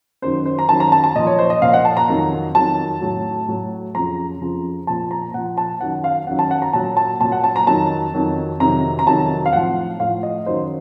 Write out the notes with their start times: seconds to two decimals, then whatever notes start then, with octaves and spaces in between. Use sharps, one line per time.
0.22 F#2 D#3 F#3 C5
0.46 C5
0.59 A#5
0.69 F#2 D#3 F#3 A5
0.80 A#5
0.92 A5
1.04 A5
1.15 A#2 D#5
1.19 F3
1.27 C#5
1.39 C5
1.50 D#5
1.62 A#2 F3 F5
1.73 F#5
1.85 A5
1.97 A#5
2.09 F2 D#3 F#3
2.55 F2 D#3 F#3 A5
3.01 A2 F#3
3.48 A2 F#3
3.95 F2 C#3 F3 A#5
4.41 F2 C#3 F3
4.87 A#2 F3 A5
5.11 A#5
5.34 A#2 F3 F#5
5.57 A5
5.81 F#2 D#3 F#3 F#5
6.04 F5
6.27 F#2 D#3 F#3 F#5
6.39 A5
6.51 F#5
6.62 A#5
6.73 A#2 F#3 A5
6.97 A5
7.21 A#2 F#3 A5
7.32 F#5
7.44 A5
7.56 A#5
7.67 F2 D#3 F#3 A5
8.14 F2 D#3 F#3
8.60 F2 C3 D#3 F#3 A#5
8.99 A#5
9.07 F2 C3 D#3 F#3 A5
9.46 F5
9.53 A2 F3 F#5
10.00 A2 F3 F5
10.23 D#5
10.46 F#2 D#3 F#3 C5